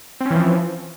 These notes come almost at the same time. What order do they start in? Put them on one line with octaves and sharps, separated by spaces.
C4 C#4 E3 F3